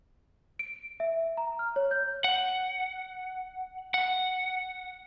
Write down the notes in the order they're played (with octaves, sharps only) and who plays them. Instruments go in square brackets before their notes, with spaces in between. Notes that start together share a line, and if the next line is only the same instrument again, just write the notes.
[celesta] D7
E5
A#5
F6
C#5
G6
[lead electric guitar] F#5
F#5